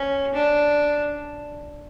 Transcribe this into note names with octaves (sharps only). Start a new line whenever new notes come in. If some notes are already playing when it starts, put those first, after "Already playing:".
Already playing: C#4
D4